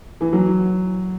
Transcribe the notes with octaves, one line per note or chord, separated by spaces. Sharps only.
E3
F#3